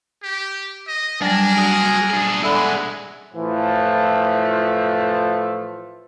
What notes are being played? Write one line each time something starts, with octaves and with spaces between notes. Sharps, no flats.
G4
D#5
F#3 G3 D4 A#4 G#5
F#4 G#4
D4 G#4
G#3 D4 E4 A4 D5 F#5 G#5 B5
A2 E3 F3 A3 F4